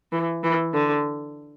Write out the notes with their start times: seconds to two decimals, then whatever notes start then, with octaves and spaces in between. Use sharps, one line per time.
0.12 E3
0.44 E3
0.73 D3